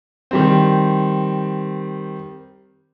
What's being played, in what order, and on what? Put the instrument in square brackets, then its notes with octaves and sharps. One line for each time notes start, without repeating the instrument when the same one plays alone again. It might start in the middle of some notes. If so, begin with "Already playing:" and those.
[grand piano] D#3 G3 C4